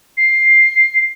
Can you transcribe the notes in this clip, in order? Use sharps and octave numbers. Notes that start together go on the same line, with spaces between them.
C7